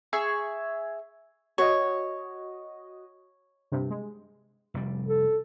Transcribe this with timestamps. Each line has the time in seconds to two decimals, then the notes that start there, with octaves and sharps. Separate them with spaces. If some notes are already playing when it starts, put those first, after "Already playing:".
0.13 G#4 E5 C#6
1.58 F#4 C#5 D#5
3.72 G2 C3
3.90 G#3
4.74 F1 G3
5.08 A4